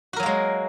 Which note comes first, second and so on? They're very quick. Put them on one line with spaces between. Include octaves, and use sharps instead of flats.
F#4 A#4 F#3 A#3 G#3